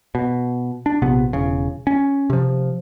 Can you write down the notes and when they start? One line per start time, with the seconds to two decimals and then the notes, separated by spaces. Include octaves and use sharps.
0.15 B2
0.86 D4
1.02 A#1 C3 B3
1.33 E1 C#3
1.87 C#4
2.30 C3 F3